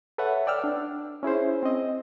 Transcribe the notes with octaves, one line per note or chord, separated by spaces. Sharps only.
A4 B4 C#5 E5 F#5
D5 G5 E6 F6
D4
C#4 E4 G#4 C5
C4 D#5